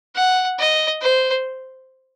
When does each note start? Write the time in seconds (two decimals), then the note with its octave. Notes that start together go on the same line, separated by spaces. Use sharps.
0.15 F#5
0.58 D#5
1.02 C5